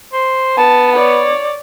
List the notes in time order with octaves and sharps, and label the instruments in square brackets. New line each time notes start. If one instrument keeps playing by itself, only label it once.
[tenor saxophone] C5
[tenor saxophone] B3 [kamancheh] A5
[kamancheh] C#5 D5